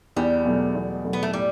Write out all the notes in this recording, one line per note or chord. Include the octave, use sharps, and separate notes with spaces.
E2 G3
B2 F#3 A3
E2
B2 F#3 A3
B3
A3
A2 G3